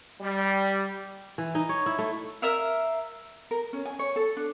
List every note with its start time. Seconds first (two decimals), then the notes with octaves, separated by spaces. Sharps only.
0.21 G3
1.38 E3
1.55 D#4
1.69 C#5
1.86 E4
1.98 A3
2.42 A#4 E5 F5
3.51 A#4
3.73 C#4
3.86 G#5
3.99 C#5
4.16 A4
4.37 D4